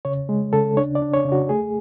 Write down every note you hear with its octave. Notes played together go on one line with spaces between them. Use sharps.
C#3 C#5
G#3
C#3 A4
D4 C#5
D5
D4
C#5
C#3
F#4
A3 G#4